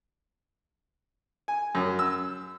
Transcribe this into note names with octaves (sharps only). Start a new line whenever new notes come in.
G#5
F#2
E6